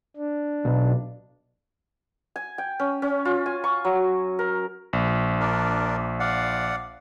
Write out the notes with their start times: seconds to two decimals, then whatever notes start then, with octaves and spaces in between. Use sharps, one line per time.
0.16 D4
0.65 B1
2.36 G#5
2.58 G5
2.80 C#4
3.02 C#4
3.25 F4
3.46 G#5
3.64 C#6
3.85 F#3
4.39 A#4
4.93 A#1
5.40 D4 A#4 D5
6.20 D5 F5 F#5